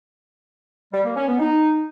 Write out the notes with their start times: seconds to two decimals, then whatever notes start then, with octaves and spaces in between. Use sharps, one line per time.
0.93 G3
1.05 A#3
1.16 C#4
1.28 B3
1.39 D#4